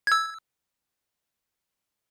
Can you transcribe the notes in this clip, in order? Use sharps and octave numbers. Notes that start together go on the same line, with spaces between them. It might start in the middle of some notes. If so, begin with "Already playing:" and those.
E6 G#6